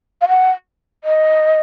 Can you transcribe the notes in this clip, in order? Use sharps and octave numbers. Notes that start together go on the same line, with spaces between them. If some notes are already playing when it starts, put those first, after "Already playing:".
F5
F#5
D#5